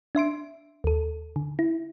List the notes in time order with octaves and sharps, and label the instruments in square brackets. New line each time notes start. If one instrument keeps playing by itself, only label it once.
[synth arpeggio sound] D4 E5 C6 D7
D#2 A4
D3
E4